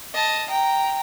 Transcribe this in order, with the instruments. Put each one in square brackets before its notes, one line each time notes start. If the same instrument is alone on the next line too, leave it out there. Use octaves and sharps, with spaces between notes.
[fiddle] D#5 A5
G5 A#5